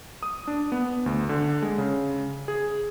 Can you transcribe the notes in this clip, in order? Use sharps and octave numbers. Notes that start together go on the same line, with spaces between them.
D#6
D4
B3
D2
D3
G#3
C#3
G#4